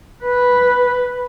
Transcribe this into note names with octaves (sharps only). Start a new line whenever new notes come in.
B4